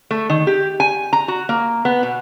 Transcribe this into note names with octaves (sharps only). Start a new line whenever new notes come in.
A3
D#3
G4
G#5
A#5
F#4
A#3
B3
B2